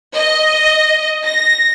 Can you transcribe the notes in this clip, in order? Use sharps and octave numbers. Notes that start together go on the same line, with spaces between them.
D#5
A#6